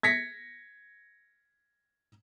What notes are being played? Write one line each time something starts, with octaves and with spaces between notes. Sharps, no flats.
G#6 A#6 B6 C#7